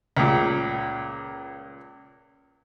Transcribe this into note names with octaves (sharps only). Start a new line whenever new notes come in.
C#2 A#2